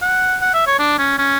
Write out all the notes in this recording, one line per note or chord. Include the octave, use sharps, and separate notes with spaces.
F#5
F#5
E5
C#5
D4
C#4
C#4